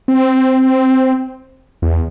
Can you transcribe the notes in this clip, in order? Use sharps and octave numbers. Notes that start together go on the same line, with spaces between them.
C4
E2